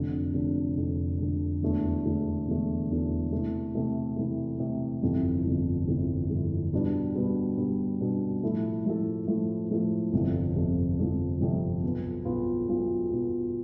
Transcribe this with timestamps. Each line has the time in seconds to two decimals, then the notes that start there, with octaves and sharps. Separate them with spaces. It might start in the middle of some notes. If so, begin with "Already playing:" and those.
Already playing: F1 F2 D3
0.34 F1 F2 D3
0.77 F1 F2 D3
1.19 F1 F2 D3
1.62 E1 E2 D3 A3
2.04 E1 E2 D3 A3
2.47 E1 E2 D3 A3
2.90 E1 E2 D3 A3
3.33 C3 E3 A3
3.75 C3 E3 A3
4.17 C3 E3 A3
4.60 C3 E3 A3
5.02 G1 F2 C3 E3
5.45 G1 F2 C3 E3
5.87 G1 F2 C3 E3
6.30 G1 F2 C3 E3
6.73 B2 G3 B3 D4
7.15 B2 G3 B3 D4
7.57 B2 G3 B3 D4
8.01 B2 G3 B3 D4
8.43 A2 F3 A3 E4 A4
8.85 A2 F3 A3 E4 A4
9.27 A2 F3 A3 E4 A4
9.71 A2 F3 A3 E4 A4
10.13 G1 F2 C3 F3
10.55 G1 F2 C3 F3
10.98 G1 F2 C3 F3
11.41 G1 F2 C3 F3
11.83 B1 B2 B3 F4
12.25 B1 B2 B3 F4
12.68 B1 B2 B3 F4
13.11 B1 B2 B3 F4